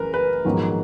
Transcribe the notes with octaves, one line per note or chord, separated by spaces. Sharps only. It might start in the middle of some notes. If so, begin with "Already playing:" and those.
Already playing: F#2 E3 A#4 B4
B4
A#1 G#2 D#3 F#3 B3